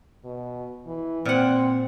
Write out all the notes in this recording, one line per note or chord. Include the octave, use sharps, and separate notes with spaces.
B2
E3
A#2 C4 F#5